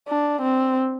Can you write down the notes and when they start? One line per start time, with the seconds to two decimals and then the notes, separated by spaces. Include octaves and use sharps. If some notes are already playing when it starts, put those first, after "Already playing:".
0.09 D4
0.42 C4